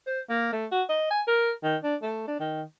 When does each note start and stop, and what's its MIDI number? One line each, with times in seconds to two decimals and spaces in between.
0.07 0.20 72
0.29 0.49 58
0.52 0.66 57
0.71 0.82 66
0.89 1.09 75
1.11 1.21 80
1.27 1.51 70
1.63 1.76 51
1.83 1.95 62
2.02 2.25 57
2.28 2.38 62
2.40 2.62 51